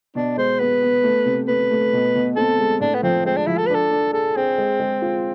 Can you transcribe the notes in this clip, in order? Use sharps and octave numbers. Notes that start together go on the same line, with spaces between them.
B2 D4
G#3 C5
B3 B4
B3
A3
C3
A3 B4
A3
B2
B2
C4 A4
G#3
A2 D4
B3
F3 C4
G#3 C4
D4
F3 E4
A4
B4
D4 A4
D4
G#4 A4
C4 G#4
G#3
G#3
F4